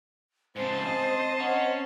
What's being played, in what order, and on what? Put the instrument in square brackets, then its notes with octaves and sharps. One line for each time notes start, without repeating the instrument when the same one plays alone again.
[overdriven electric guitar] G#2 C#3 [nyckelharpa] C4 A5 [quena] C5
[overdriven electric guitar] D#5
[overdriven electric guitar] C#4 [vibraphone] D#5 F#5 A#5